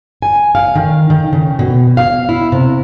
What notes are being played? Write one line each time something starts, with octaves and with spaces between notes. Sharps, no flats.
G#5
F5
D#3
D#3
C#3
B2
F5
E4
C3